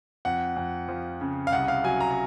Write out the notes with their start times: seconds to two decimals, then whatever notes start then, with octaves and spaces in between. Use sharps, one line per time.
0.25 F2 F#5
0.56 F2
0.89 F3
1.21 C#3
1.47 F5
1.53 C2 F#5
1.68 F5
1.84 F#3 G#5
2.01 A#5
2.11 A#5